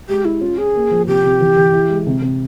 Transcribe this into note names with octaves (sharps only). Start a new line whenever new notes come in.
G#3 G4
E4 G4
C#4 F4
C#4 G#4
A#3
F3
C3 G4
C3
E3
E3
E4
G#3
C3
C3